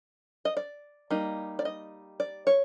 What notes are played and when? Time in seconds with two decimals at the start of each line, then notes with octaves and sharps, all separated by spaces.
0.45 D#5
0.57 D5
1.10 G3 A#3 D#4
1.59 D5
1.65 D#5
2.20 D5
2.47 C#5